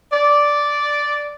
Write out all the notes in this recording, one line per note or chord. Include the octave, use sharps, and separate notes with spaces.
D5